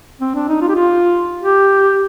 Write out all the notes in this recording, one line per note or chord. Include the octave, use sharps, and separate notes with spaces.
C4
D4
D#4
F4
G4
F4
G4